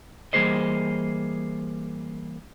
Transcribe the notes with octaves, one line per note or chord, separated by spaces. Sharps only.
E3 G3 A#3 G#4 C5 D#5